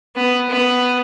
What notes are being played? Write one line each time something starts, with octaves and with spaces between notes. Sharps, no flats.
B3
B3